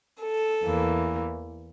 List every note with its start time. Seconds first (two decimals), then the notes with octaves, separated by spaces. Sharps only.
0.23 A4
0.62 E2 E3 A#3